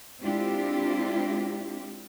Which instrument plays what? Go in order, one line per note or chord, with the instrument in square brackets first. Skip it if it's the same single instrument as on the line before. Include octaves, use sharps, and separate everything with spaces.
[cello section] G#3 C4 D4 E4 F4 G4